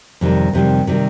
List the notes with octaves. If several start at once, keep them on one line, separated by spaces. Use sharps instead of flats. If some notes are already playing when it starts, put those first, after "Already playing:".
F2 C3 D#3 G3
F2 C3 D#3 G3
C3 D#3 G3